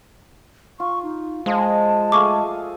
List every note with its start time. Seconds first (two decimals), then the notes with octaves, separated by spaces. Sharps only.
0.80 F4 C#6
1.03 D#4
1.46 F3 G#3 F4 D#5 A5
2.12 A3 G#4 F5 C#6 D6